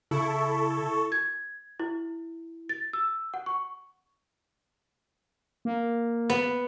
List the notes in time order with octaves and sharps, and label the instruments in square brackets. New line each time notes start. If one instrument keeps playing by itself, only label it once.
[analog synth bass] C#3 [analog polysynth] E4 [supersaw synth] A4 [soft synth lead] C#6
[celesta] G#6
E4
A6
E6
F#5
C#6
[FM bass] A#3
[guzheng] B3